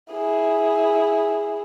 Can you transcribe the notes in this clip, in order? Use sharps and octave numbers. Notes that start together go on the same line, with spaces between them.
E4 G#4